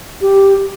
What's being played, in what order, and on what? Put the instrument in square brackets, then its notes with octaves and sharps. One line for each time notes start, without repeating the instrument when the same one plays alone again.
[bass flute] G4